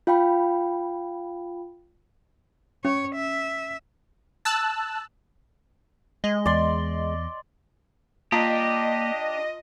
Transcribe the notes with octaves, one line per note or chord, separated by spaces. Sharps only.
F4 F5 G5 B5
C#4 C#5
E5
A5 E6 F#6
G#3 D#5
E2 D5 C6
A#3 D4 F4 G4 D#5 A5 A#5